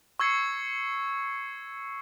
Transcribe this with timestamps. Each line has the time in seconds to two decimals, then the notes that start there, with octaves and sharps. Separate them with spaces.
0.20 C#6 E6 G#6 C7 C#7